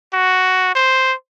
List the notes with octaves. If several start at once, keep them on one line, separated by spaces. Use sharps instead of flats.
F#4
C5